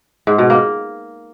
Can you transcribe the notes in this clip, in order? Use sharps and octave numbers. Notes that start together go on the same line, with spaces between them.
G#2
B2
A#3